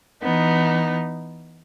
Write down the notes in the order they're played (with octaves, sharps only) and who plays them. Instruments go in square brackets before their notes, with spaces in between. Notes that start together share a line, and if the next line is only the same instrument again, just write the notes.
[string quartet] E3 B3 D#4